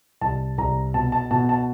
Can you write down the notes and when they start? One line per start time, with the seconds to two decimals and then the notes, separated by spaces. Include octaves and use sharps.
0.21 C2 A5
0.58 C2 A#5
0.94 B2 A5
1.12 A5
1.31 B2 A5
1.49 A5